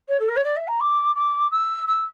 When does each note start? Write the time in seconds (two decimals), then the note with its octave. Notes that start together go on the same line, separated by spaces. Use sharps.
0.08 C#5
0.19 A4
0.28 A#4
0.36 C#5
0.43 D5
0.56 E5
0.67 A#5
0.80 D6
1.15 D6
1.51 E6
1.87 E6